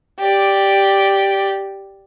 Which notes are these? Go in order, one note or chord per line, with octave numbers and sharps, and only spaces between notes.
G4 D5